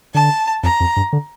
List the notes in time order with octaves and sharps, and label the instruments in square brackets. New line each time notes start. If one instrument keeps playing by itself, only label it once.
[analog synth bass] D3 [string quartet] A5
[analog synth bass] F2 [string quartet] A#5
[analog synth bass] F2
G2
D3